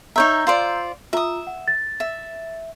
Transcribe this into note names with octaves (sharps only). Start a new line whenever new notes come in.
D#4 C#5 E5 A#5 E6 G6
F4 C5 D5
F4 E5 A#5 D#6
F#5
A6
E5